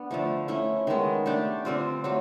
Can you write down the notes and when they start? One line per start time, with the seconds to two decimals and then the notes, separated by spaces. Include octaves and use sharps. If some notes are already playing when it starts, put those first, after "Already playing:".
Already playing: B3 D4
0.11 D3 F3 A3
0.48 A3 C#4 E4
0.87 D#3 G#3 B3
1.26 A3 D4 G4
1.65 D3 G3 C4 F4
2.04 F#3 A3